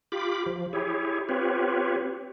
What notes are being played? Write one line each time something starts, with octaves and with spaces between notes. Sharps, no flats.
F4 G4 B5 D6
F3
E4 G4 G#4 C#5
C4 F4 G4 B4 C#5